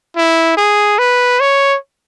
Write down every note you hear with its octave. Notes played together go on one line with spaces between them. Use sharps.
E4
G#4
B4
C#5